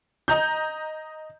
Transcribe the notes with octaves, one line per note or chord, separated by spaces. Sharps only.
D#5 A#5 G6